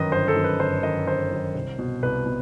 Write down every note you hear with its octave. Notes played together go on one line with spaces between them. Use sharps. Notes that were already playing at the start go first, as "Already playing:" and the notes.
Already playing: G1 F#2 D#3 B4 D#5
G1 C5
A4
F#2 D#3
B4
G1 C5
F#2 D#3 D#5
G1 C5
F#2 D#3
C2
B2
C2 B4
B2